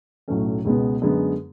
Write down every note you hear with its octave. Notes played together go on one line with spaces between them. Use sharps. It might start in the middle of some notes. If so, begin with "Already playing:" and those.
B1 A2 F#3 A3 C#4
C#2 B2 G#3 B3
F#2 D3 G#3 B3